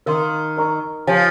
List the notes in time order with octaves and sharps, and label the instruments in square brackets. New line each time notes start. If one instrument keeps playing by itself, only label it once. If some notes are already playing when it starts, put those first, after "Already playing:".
[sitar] D#3 [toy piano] A#4 F5 C6
[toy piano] A#4 D#5 A#5 C#6
[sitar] F3 [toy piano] G4 C#5 F5 G#5